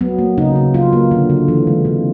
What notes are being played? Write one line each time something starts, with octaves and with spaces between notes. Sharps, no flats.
F#3 B3
A#3
C#3 D#4
C#3
F#3 F4
A#3
D3
D3
E3
G#3
C3